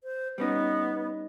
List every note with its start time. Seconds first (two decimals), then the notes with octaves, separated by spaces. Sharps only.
0.04 C5
0.38 G3 B3 C#4 D#4